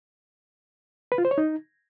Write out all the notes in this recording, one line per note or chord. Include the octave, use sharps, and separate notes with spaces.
B4
F4
C5
C#5
D#4